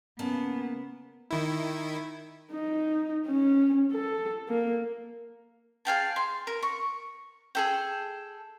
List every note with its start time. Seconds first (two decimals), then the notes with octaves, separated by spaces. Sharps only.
0.19 C#3 A#3 B3 A5
1.31 D#3 E4
2.52 D#4
3.26 C#4
3.93 A4
4.48 A#3
5.85 G#4 F5 G5 A5
6.16 C6
6.47 A#4
6.63 C#6
7.55 G#4 A4 G5